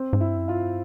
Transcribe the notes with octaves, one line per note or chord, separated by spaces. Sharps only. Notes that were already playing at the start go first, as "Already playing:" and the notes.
Already playing: C4 C5
G#2
G2 E4 E5
F#2
G2 F4 F5